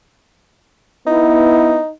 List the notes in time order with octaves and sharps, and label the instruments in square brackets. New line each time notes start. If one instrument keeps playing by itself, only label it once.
[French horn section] B3 E4 [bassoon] D#4